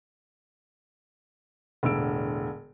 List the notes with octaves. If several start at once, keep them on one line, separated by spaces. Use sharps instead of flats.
E1 A2 D3 E6 D7